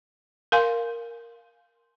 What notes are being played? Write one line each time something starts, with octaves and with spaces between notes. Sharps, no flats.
A#4 F5 G#5 C6